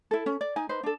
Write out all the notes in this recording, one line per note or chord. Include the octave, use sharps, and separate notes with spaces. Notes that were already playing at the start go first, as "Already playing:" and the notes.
E4 A4
C#4
D5
D#4 G#5
D#4 B4 C5
D4 A4